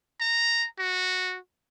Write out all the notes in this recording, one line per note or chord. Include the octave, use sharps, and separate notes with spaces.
A#5
F#4